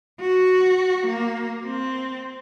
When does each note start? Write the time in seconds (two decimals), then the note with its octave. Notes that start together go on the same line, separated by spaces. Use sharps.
0.20 F#4
1.07 A#3
1.65 C4